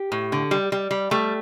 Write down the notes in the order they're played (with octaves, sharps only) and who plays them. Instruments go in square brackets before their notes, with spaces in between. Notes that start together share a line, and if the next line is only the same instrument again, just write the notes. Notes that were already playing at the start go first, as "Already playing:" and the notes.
Already playing: [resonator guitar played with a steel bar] G4
A2
D3
G3
G3
G3
G3 A3